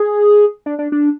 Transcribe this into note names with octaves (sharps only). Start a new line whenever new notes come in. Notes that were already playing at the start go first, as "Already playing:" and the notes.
Already playing: G#4
D4
D4
D4